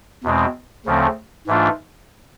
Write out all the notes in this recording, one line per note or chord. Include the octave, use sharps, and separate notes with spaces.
E2 B2 G#3 C4
D2 C#3 F3 A3 C4
G#2 E3 A3 D4 F4